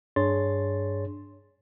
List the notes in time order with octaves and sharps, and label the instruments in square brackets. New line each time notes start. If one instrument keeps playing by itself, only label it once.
[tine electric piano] G2 D4 G#4 C#5 C6 A6